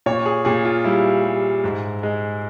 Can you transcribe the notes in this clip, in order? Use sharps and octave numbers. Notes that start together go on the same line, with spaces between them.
A#2 C#5
G#4
A#2 G#4
F4
G3 E4
G3
G#2
G#3